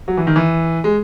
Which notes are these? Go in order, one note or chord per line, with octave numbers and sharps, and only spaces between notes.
F#3
E3
D#3
E3
G#3